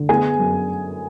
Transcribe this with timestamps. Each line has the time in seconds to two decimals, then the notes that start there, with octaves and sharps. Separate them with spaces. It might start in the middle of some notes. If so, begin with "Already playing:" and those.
Already playing: D3
0.09 B3 G#4 G#5
0.39 F#2